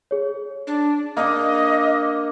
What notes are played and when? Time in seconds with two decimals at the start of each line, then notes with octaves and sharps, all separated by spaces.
0.11 G#4 C#5
0.67 D4
1.17 A#3 D4 D#5